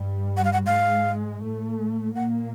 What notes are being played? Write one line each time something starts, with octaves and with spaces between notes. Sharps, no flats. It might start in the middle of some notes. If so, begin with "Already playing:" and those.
Already playing: G2 G3
F#5
F5
F#5
G#2 G#3 F5
A2 A3
A#2 A#3 F#5